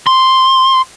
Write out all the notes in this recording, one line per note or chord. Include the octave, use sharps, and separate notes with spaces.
C6